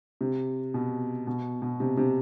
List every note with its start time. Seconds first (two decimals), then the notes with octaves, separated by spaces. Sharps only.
0.21 C3
0.74 B2
1.27 B2
1.62 B2
1.80 C3
1.97 C3